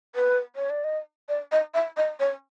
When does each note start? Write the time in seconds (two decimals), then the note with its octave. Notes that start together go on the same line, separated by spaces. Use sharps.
0.15 B4
0.56 C#5
0.70 D5
0.84 D#5
1.29 D5
1.52 D#5
1.74 E5
1.97 D#5
2.20 C#5